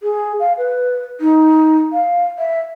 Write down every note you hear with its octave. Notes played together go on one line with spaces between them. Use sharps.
G#4
F5
B4
D#4
F5
E5